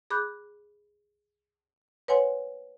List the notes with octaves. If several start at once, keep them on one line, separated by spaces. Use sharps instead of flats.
G#4 B5 D6 F#6 G6
B4 C#5 F#5 G#5 C6